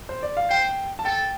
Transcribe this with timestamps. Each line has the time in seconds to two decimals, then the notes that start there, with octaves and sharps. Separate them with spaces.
0.09 C5
0.23 D5
0.37 F5
0.49 C5 G5
0.99 A5
1.05 A4 G5